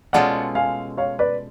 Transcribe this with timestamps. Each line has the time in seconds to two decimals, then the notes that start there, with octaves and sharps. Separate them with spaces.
0.13 B2 G#3 C#4 F4 A4 D5 F#5
0.55 F5 G#5
0.97 C#5 F5
1.19 B4 D5